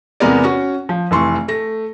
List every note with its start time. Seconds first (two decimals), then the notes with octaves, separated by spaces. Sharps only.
0.20 E2 C3 G#3 B3 A#4 D5
0.44 C#4 F#4
0.89 F3
1.11 F1 E3 C6 C#6
1.48 A3 A#6